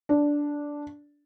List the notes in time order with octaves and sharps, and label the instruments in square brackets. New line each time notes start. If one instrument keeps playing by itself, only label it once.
[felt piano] D4